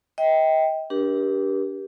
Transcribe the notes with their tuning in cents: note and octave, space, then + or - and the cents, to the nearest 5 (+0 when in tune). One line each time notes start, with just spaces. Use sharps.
D#5 +40 G5 +0
D4 -15 G4 +0 A#4 +45